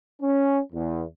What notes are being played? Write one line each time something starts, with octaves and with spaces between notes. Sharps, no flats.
C#4
E2